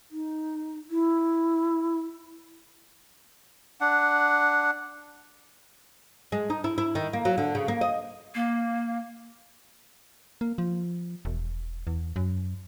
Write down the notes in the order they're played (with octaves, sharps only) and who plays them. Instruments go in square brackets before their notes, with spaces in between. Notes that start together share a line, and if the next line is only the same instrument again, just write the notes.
[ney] D#4
E4
[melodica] D4 F#5
[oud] G#3
D#4
E4
E4
D#3
A#3
F#3
D3
C#3
A#3
D#5
[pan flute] A#3
[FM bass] A#3
F3
E1
E2
F#2